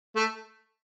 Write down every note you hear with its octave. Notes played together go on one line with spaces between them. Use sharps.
A3